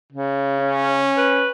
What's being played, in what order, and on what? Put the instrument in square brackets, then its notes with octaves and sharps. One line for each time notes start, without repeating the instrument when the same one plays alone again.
[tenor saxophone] C#3
[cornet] C#4
[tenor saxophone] B4